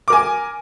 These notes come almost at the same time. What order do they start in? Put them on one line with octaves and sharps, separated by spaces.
D6 A#4 G#5